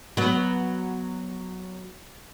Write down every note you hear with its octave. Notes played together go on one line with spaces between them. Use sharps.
F#3 B3